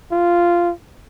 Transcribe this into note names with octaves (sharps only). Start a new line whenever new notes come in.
F4